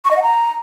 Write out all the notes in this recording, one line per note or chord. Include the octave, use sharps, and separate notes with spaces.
C#6
D#5
F#5
A#5